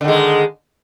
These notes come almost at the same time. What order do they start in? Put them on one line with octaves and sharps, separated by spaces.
D3 D#3 G#3